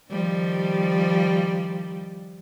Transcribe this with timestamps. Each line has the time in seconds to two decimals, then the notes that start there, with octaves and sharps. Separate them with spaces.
0.10 D#3 F3 G3